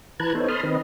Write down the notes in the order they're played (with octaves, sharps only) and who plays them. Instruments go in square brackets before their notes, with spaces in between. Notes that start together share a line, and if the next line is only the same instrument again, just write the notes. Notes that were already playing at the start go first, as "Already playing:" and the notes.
[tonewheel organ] E3 B4 A5 A#5 F#6 G#6
B3 D#4 A4 C5 C#5
A5 B5 C6 D#6 F6
D#3 C4 B4 D#5